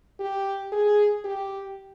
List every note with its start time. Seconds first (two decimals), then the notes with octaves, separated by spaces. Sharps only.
0.19 G4
0.72 G#4
1.25 G4